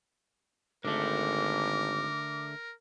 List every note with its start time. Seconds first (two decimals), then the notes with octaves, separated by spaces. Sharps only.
0.85 G#1 D3 A3 A#4 D6